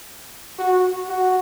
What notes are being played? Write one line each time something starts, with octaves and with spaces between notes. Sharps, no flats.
F#4
F#4